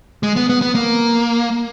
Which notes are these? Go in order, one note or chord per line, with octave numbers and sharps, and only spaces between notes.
G#3
B3
B3
B3
A#3